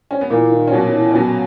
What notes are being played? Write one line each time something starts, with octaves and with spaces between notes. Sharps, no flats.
C#4
B3
A#2 E3 A#3
D#3
C#4
B2 F#3 B3
D#3
E3
C#4
B2 F#3 B3